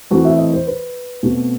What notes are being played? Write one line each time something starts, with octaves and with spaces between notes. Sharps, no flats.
E3 A3 C4 F#4
E5
D#5
C5
B4
B2 A3 C4